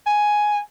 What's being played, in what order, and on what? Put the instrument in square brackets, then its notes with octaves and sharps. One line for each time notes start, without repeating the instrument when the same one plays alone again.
[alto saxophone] G#5